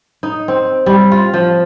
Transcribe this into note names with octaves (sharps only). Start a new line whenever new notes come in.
D#4
C4
G3
F4
F3